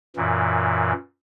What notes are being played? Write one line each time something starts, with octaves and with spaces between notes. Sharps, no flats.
F#2 A#2 E3